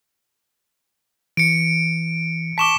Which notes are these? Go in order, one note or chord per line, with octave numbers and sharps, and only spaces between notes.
E3 C#7 D7
A5 C#6 D6 B6 E7 G7